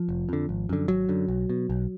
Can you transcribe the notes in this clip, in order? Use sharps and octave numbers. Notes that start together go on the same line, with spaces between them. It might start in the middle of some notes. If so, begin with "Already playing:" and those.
Already playing: F3
F1
F2 D3
G#1
F#2 D3
G#1 F#3
F#2 D3
B1
B2
B1